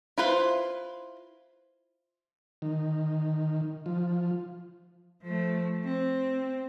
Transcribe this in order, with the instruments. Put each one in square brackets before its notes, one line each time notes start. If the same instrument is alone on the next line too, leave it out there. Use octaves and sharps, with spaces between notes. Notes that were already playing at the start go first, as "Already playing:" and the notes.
[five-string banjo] E4 F4 B4 C5
[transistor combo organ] D#3
F3
[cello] F3 A3
C4